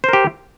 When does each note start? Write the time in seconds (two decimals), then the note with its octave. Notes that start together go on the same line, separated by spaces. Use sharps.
0.04 C5
0.09 A#4
0.13 G4